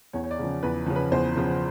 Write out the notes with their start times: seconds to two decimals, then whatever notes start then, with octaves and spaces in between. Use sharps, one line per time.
0.13 E2 C#5
0.24 C#5
0.31 D5
0.39 C#3 F3
0.63 E2 B4
0.86 C#3 F3
0.96 B4
1.11 E2 C5
1.36 C#3 F3